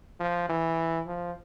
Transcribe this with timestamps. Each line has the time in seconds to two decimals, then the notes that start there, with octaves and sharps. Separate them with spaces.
0.20 F3
0.49 E3
1.06 F3